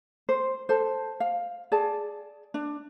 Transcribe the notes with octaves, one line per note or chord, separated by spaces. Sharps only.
C5
A4 C5
F5
G#4 D5 A5
D4